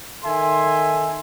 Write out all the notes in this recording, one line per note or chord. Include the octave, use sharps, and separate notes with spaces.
D#3 A4 E5 G#5 C6